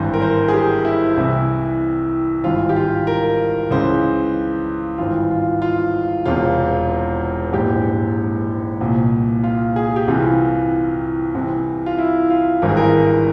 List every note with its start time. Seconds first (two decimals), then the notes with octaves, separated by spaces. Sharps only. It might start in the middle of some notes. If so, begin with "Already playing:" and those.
Already playing: G#1 G2 E3 C5
0.14 A#4
0.22 C5
0.48 G#4
0.53 G4
0.85 E4
1.17 C2 C3 E3 E4
2.44 G#1 G2 E3 F4
2.69 G4
2.76 F4
3.07 A#4
3.71 C#2 C#3 E3 C5
4.98 G#1 G2 E3 F4
5.31 F4
5.62 F4
6.25 E1 E2 C3 F4
7.53 A#1 G#2 E3 G4
8.81 C2 A#2
9.44 F4
9.76 G#4
9.96 G4
10.08 C2 C3 E3 F4
11.35 C2 C3 E3
11.86 F4
11.99 E4
12.30 F4
12.62 G#1 G2 E3 A#4
12.69 G#4
12.77 A#4